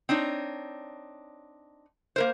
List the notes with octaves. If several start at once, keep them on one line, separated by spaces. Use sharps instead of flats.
C4 D4 D#4 C#5
A#3 A#4 C5